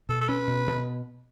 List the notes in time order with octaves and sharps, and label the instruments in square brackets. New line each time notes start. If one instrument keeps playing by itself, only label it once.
[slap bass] B2 [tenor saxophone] A4
[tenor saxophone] A4
[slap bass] C#4 [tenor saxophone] B4
[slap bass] B2
B2